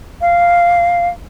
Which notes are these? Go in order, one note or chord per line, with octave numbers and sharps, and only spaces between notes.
F5